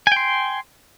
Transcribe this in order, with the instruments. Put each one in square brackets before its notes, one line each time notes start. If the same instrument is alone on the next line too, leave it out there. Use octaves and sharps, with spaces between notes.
[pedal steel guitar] G#5
G5
C6